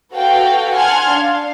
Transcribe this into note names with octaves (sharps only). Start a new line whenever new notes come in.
F#4 A4 B4 F5 G5
F#5 G#5 A5 C6 F6 G#6
D4 F5